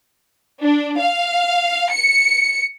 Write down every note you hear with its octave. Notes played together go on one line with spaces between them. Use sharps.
D4
F5
C#7